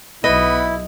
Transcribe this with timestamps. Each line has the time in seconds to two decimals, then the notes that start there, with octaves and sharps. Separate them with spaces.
0.24 B1 B3 E4 D#5